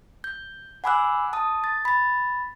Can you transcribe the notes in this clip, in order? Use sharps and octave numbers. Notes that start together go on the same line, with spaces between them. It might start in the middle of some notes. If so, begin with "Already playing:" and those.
G6
F#5 G#5 B5 D6 E6 F#6
A5 D#6
A6
B5 A6